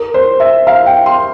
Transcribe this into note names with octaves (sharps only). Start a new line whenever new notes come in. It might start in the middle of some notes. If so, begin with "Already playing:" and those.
Already playing: A#4
C5
E5
F5
G5
C6